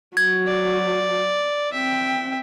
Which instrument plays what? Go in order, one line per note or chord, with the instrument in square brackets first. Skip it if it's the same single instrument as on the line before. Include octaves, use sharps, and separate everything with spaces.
[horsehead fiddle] F#3 F#4 [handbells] G#6
[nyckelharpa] D5
[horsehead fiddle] C4 G5 [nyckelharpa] E5